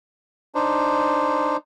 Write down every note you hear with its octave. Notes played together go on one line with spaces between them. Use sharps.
D4 D#4 C5